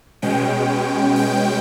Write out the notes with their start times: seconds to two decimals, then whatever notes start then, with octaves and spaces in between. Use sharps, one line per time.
0.22 B2 G#3 C#4 G5
1.16 G5